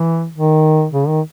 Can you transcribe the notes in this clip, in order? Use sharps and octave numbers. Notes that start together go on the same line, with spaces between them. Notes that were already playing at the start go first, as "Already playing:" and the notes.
Already playing: E3
D#3
C#3
D#3